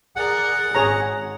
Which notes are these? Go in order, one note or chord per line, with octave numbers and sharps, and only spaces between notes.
G#4 A#4 D5 F#5
G#1 G#4 C#5 A#5